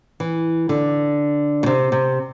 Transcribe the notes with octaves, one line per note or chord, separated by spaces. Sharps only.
E3
D3
B2
C3
C3